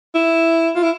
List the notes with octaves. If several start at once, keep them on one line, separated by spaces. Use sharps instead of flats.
E4
F4
E4